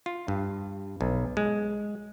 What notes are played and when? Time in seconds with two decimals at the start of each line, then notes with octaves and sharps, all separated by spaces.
0.06 F4
0.28 G2
1.01 B1
1.37 G#3